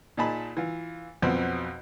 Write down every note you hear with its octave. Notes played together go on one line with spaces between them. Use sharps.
A#2 D#4 G#4 A5 B5
E3 F4
B1 F2 B2 C4